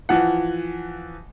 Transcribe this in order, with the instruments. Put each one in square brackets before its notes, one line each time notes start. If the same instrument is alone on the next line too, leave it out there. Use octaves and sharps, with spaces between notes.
[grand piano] E3 F3 F#5